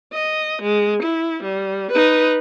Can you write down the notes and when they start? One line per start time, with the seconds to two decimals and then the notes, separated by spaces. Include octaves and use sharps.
0.13 D#5
0.62 G#3
1.03 E4
1.43 G3
1.91 D#4 B4